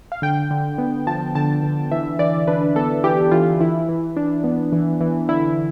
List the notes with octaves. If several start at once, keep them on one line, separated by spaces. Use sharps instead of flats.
F5
D3 G5
D3
B3
F3 A5
D3 A5
D3
E3 E5
E3 D5
D4 B4
B3 A4
E3 G4
E3 F4
E3 E4
E3
D4
B3
E3
E3
D3 E4